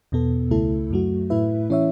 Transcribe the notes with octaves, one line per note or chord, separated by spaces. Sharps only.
E2 B2 B3 A4
C#2 C#3 A3 E4 A4
F#2 F#3 A3 F#4
A2 A3 E4 B4 E5
E3 C#4 E4 C#5 E5